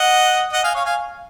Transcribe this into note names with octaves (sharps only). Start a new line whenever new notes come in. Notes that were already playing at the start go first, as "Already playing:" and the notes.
Already playing: D#5 F#5
D#5 F#5
F5 G#5
C#5 F5
F5 G#5